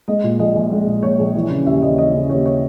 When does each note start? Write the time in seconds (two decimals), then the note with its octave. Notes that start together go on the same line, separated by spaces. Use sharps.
0.08 G#3 D#5
0.24 A#2
0.39 A#1 D#5
0.56 A#1
0.71 G#3
0.87 A#2
1.02 A#1 C#5
1.19 A#1
1.35 E3
1.50 C#3
1.66 D#2 E5
1.82 D#2 D#5
1.98 E3 D#5
2.14 C#3
2.30 D#2 C#5
2.46 C#5